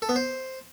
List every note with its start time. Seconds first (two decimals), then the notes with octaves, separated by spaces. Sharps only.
0.02 A4
0.09 B3
0.16 C5